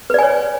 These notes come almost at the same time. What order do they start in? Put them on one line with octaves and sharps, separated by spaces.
B4 D5 G#5 C#5